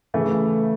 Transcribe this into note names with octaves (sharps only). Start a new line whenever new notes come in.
C#3 E3 A3